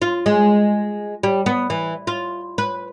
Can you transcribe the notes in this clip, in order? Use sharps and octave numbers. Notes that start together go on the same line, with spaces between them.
F4
G#3
G3
B3
E3
F4
B4